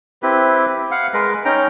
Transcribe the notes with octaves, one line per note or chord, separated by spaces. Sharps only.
C4 E4 G4 B4
F5 F#5
G#3 A#4 B4
C#4 D#4 G5 A#5